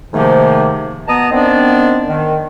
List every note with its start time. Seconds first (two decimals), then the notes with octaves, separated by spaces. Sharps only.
0.13 G#2 C3 D#3 F3 A3 A#3
1.07 B2 B3 A5 A#5 D#6
1.31 D#3 B3 C4 D4 C5 D5
2.08 D#3